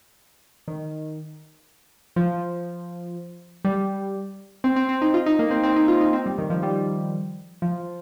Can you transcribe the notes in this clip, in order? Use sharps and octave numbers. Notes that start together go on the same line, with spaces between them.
D#3
F3
G3
C4
C4
C4
D#4
F4
D#4
A#3
C4
C4
D#4
F4
D#4
C4
G3
D#3
F3
G3
F3